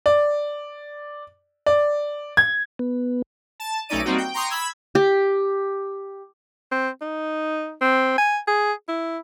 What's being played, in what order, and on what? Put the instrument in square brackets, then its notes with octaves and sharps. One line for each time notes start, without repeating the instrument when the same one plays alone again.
[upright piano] D5
D5
G#6
[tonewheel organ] B3
[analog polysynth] A5
B1 A3 C#4 D#4 D5 D#7
G3 A#3 C4 D#4 F#4
G5
G5 A#5 C6 C#6 D#6
B5 E6 G#6
[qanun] G4
[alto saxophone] C4
D#4
C4
G#5
G#4
E4